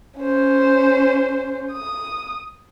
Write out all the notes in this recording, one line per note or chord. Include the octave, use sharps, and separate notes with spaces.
C#4 C5
D#6